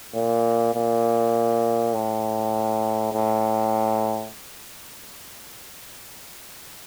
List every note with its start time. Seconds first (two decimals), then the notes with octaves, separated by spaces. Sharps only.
0.15 A#2
0.74 A#2
1.94 A2
3.13 A2